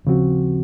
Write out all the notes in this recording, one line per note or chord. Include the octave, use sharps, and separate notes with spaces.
D#2 C#3 F3 C4 F#4